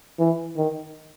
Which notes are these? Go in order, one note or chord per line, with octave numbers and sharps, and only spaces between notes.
E3
D#3